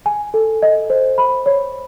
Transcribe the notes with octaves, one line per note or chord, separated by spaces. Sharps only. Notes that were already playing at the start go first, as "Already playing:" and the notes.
G#5
A4
D#5
C5
B5
C#5